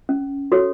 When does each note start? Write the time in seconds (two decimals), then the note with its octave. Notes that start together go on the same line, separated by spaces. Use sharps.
0.09 C#4
0.52 F#4 A4 C#5